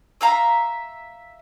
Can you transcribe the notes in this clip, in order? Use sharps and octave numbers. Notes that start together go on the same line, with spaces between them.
E5 F5 A#5